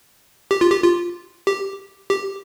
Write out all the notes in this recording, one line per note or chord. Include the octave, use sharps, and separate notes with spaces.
G4
F4
G4
F4
G4
G4